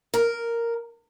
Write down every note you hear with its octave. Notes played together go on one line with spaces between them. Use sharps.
A#4